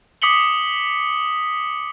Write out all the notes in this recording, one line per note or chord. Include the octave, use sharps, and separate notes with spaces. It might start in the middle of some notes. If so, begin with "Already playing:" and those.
D6 D#6 B6 C#7 F#7 G7